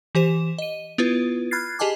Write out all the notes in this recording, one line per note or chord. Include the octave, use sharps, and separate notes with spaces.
E3 G4 C5 E7
D#5 D#7
B3 E4 F4 B4
B5 F6 F#6 G#6 A6 C7
G4 G#4 D#5 G#5 A5 D6